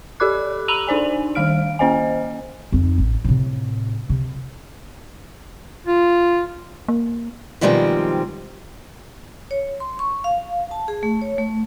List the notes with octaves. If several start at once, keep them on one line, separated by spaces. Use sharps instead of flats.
G4 A4 D5 B5 D6 F#6
A#5 B5 E6 D#7 F7 F#7
D4 D#4 C5 D5 G#5
D#3 G3 F5 F6 D7
A#3 C#4 C5 D#5 G#5
F2 D#4
A1
A2 C3
C3
F4
A#3
B2 D#3 F3 G3 G#3 C4
C#5
C6
C#6
F5
A5
G#4
A3
C#5
A3